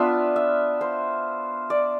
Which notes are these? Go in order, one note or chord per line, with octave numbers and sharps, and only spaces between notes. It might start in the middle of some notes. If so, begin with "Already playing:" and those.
Already playing: B3 D4 F4 E5
E5
C5
D5